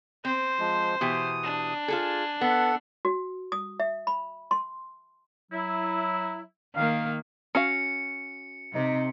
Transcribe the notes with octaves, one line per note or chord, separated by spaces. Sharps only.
C4 C5
F3 G#3
B2 E3 G4 D#6
D4
F4 G#4 A4 G#5
B3 A4 F#5
F#4
D#6
E5
B5
C6
F#3 E4
D#3 A#3 F5
C#4 F#4 F5 C#7
C3 D#4